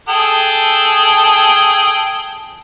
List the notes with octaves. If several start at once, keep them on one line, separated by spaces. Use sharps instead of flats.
G#4 A4 G5